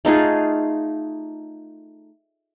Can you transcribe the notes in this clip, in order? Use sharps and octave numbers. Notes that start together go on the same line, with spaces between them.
A3 D#4 F4 G#4